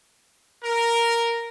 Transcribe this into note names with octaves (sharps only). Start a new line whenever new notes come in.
A#4